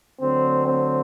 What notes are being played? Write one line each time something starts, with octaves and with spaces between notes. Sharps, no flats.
D2 D3 F#3 C4
C4